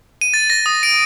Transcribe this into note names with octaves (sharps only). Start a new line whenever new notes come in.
D#7
A6
A#6
D#6
D7